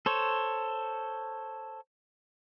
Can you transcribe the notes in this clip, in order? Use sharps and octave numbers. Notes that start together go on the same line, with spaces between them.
A4 C5 C#5